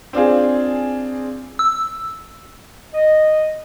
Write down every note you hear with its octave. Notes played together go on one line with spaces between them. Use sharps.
C4 D4 F4 G#4
E6
D#5